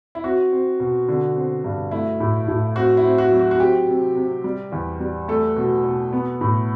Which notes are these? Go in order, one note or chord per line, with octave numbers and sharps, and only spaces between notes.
E4
C4 F#4
C4
B2
D3
C4
G2
A3 E4
A2
A2
C4 F#4
E4
C4
F#4
F#3
F#4
F#4
C4 G4
C3
C3
G3
E2
G3
A3 A4
B2
B2
B3
A2